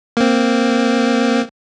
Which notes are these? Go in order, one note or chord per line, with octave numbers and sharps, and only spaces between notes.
A#3 C4